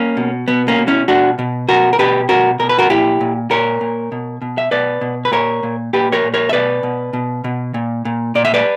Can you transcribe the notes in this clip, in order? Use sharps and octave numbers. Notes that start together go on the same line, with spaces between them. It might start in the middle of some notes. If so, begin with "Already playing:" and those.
Already playing: A#3 C#4
B2
B2 B3
A#3 C#4
B2
C#4 E4
B2 D4 F#4
B2
B2 F#4 A#4
A#4
B2 G4 B4
B2 F#4 A#4
B2 A#4
B4
F#4 A#4
A#2 E4 G4
A#2
A#2 A#4 C#5
A#2
B2
B2
E5
B2 B4 D5
B2
B4
A#2 A#4 C#5
A#2
A#2 G4 B4
A#4 C#5
A#2
A#4 C#5
E5
B2 B4 D5
B2
B2
B2
A#2
A#2
A#2 D5
E5
B4 D5